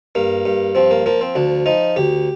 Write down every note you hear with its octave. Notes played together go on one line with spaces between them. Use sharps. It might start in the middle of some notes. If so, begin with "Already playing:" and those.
G2 A#3
G2
F3 C4
A#3
F3 A#3
C4
D2 D4
F3 D#4
D2 G4